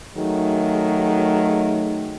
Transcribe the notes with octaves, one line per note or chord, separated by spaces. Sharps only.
D#3 F#3 A3 G#4